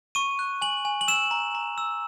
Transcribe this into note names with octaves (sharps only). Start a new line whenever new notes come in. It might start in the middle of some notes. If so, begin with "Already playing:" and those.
C#6 D#7
F#6
G#5 F#7
G#5
F#7
E6 E7
A#5
A#5
E6